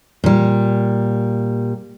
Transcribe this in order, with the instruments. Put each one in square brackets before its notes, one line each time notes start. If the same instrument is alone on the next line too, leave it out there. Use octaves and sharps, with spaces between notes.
[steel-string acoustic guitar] A#2 G3